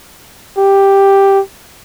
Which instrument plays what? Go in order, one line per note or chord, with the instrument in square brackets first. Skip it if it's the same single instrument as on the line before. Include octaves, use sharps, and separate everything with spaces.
[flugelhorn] G4